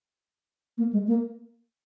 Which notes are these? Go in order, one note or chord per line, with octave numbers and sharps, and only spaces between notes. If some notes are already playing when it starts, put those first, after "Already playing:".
A#3
G#3
A#3